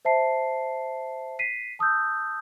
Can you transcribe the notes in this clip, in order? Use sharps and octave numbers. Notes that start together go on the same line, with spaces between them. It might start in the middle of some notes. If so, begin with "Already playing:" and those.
C5 E5 A5 C7
B6 C7 D#7
A5 D#6 E6 G6